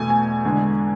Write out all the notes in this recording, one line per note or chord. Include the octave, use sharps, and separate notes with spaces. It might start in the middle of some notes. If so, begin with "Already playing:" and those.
Already playing: E2 B2 A3 G#5
G#5
E2 D3 G#3